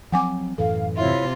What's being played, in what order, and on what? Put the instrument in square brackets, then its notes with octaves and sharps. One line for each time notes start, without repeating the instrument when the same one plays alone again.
[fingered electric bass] F3 F#3 C4 [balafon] F#5 G#5 D6
[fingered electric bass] F#2 A2 E3 [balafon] A4 [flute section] F5
[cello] C3 F4 [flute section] E4 C#5 [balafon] E5